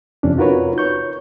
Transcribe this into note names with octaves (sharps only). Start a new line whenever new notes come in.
F2 C3 C#4 D4
D#4 F4 F#4 A#4 B4 C#5
C#5 C#6 G6